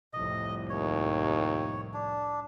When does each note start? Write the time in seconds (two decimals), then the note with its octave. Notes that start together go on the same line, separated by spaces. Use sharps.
0.13 C2 F2 A2 D#5
0.70 D#2 C#5
1.94 D4